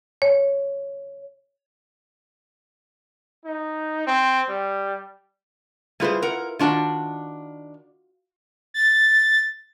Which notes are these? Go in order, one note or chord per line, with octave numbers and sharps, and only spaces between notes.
C#5
D#4
C4
G3
G3 E4 F4 G#4 B4 C5
A#4 F#5
D#3 D4 F4 F#4 A5
A6